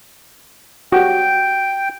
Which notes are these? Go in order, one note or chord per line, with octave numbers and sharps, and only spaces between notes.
F#4 G4 G5